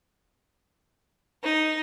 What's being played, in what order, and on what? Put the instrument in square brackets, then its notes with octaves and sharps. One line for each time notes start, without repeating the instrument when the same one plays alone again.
[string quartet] D#4